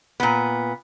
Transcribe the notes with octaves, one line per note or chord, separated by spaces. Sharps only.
A#2 B3